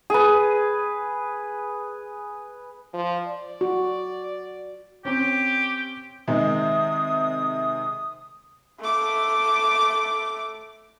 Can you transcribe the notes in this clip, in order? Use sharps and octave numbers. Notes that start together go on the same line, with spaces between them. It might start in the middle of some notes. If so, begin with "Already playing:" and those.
G#4 B4
F3
D5
F#4
C4 C#4 G4
C3 D#3 G#3 D#6
A3 D6